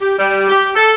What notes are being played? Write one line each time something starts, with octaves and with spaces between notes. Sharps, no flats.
G4
G3
G4
A4